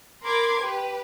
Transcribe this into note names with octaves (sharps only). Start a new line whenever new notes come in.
A#4 B5 C6 D6 G#6
G4 B4